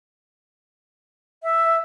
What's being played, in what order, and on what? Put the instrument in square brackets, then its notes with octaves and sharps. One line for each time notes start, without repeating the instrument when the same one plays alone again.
[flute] E5